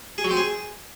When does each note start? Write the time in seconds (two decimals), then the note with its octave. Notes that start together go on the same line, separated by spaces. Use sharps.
0.18 G#4
0.24 F#3
0.31 C4
0.37 G#4